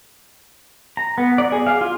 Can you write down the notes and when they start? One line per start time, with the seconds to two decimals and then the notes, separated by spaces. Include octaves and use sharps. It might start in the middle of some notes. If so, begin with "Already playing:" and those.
0.97 A#5
1.18 B3
1.38 D5
1.52 G#4
1.67 F5
1.81 F4